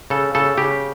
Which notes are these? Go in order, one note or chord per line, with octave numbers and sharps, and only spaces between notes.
C#3 A4
C#3 A4
C#3 G4